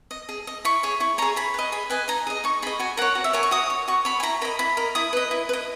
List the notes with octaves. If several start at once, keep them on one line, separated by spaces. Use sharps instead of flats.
D#5
G#4
D#5
E4 C#6
G#4 C#5
E4 C#6
G#4 C#5 A#5
G#4 B5
B4 D#5
G#4 B5
B4 D#5 G#5
D#4 A#5
G#4 D#5
D#4 C#6
G#4 D#5 B5
F#4 G#5
A#4 C#5 F#5
F#4
E5
A#4 C#5 G#5
C#6
F#4 D#6
C#5
F#4 C#6
C#5 B5
G#5
E4 A#5
A#4 D#5 B5
E4 B5
A#4 D#5
E4 D#6
B4 D#5
E4
B4
D#5